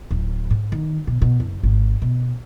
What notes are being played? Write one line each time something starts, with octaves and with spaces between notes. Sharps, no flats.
D1
G#2
D#3
B2
B2
F#1
G#1
B2